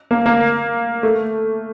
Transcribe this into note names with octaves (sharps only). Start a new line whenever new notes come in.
A#3
A#3
A3